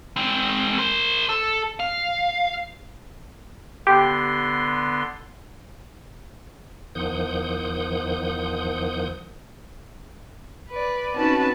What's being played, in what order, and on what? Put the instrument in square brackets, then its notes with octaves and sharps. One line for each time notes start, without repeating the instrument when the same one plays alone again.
[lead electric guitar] G#3 C4
A#4 C5
A4
F5
[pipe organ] D3 B3 C6 [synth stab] G4
[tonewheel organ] E2 D#3 F3 F#5 D#6 G6
[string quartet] B4 D5
C4 C#4 D#4 F#4 B4 A5